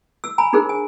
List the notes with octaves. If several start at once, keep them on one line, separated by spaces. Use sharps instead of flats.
E6
G#5 A#5 B5
D4 D#4 G#4 A#4 C5
G#5